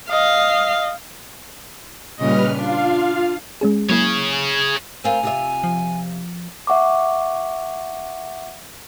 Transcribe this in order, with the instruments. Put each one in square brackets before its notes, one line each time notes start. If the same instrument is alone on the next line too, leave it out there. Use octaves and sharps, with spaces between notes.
[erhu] D#5 [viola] F5
[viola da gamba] A#2 C#3 D#5 [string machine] G3 B4 F6
[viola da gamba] D4 [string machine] F4 F5
[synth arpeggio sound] G#3 C#4 G#4
[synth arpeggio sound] F#3 A#3 E4 [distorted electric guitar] G#4 C#5
[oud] C4 F4 A#4 [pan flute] G#5
[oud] C3 F4 E5
[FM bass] F3
[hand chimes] E5 F#5 C#6 D6